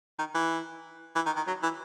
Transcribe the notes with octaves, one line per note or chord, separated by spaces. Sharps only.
D#3
E3
E3
D#3
D#3
F#3
E3